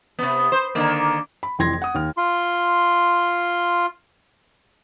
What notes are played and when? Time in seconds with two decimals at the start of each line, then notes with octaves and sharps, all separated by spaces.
0.19 C3 B3
0.52 C5
0.75 D3 D#3 A#3
1.43 B5
1.59 F1 F2 E3 C6 G#6 A#6
1.82 F#5 D#6
1.95 D#2 F6
2.17 F4 C6